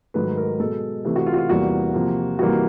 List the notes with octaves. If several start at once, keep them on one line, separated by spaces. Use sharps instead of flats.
G#2 D#3 F#3 A3 B4
A#4
B2 G#3 A4
C3 E3 A3
F#4
F4
F#4
F4
E2 C3 E3 G3 A#3 F#4
C3 F3 A#3
C3 E3 G3 A#3 F#4